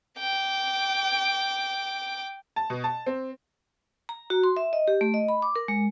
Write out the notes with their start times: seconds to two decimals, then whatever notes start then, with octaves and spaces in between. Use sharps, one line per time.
0.19 G5 D6
2.56 A5
2.70 B2
2.84 A5
3.06 C4
4.09 A#5
4.30 F#4
4.43 C6
4.57 E5
4.73 D#5
4.88 G4
5.01 A3
5.14 D#5
5.28 B5
5.42 D6
5.56 A#4
5.68 G#3